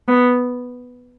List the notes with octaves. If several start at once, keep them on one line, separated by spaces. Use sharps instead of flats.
B3